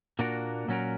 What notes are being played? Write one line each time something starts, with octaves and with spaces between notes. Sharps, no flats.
A#2 A#3 D4 F#4 A#4
A#2 F#3 C#4 F#4 A#4